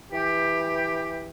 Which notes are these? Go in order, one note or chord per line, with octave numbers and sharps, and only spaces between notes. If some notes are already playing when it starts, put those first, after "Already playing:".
E3 G4